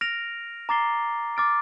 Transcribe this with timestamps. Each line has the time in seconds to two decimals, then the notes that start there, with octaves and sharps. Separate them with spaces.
0.01 F6 A#6 D7 F7
0.69 A#5 D6 A6 C7 G7
1.37 D6 F6 A6 D7